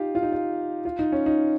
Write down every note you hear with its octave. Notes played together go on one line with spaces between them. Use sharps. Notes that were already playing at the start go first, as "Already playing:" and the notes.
Already playing: D#4 F4 G4
F4
D#4
F4
F4
D#4
C#4
D#4